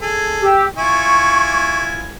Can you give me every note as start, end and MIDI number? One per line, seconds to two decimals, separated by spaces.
0.01 0.50 68
0.01 0.50 69
0.42 0.64 67
0.42 0.64 88
0.77 2.13 64
0.77 2.13 65
0.77 2.13 80
0.77 1.81 85